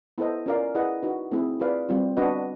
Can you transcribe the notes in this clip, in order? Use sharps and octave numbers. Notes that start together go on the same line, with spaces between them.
B3 E4 A4 C5 D#5
C#4 F4 A#4 D5 F5
E4 G#4 B4 D#5 F#5
D#4 F#4 B4
A3 C4 E4 G#4
F4 G#4 B4 D5 F5
G3 C4 F4
B3 D4 F#4 B4 D#5